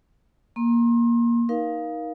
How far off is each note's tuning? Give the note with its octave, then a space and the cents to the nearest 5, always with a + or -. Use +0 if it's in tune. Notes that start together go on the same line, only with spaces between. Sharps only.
A#3 +10 C6 +35
D#4 +10 A#4 +30 F5 +0